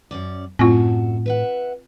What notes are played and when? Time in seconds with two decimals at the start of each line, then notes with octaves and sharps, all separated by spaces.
0.11 F#2 C#4 D5
0.59 F#2 A2 C4 F4 F#4 A4
1.26 B4 E5 F#5